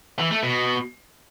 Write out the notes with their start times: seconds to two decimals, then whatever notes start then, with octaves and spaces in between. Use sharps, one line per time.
0.19 E3
0.31 A3
0.43 B2